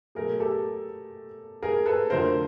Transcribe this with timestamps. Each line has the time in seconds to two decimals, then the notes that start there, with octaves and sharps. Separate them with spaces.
0.15 B2 F#3 A3 G#4 A#4
0.40 G4 A4
1.63 G#4 A#4
1.86 A4 B4
2.10 F2 D3 F#3 A3 A#4 C5